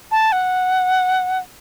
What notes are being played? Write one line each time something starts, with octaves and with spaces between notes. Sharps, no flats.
A5
F#5